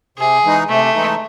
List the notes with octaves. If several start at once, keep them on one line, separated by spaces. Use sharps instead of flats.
C3 G#4
E3 G#3 D#4
C3 A3
E3 G#3 D#4